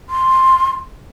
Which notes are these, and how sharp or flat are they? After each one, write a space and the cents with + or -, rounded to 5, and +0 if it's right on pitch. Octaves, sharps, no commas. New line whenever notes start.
C6 +5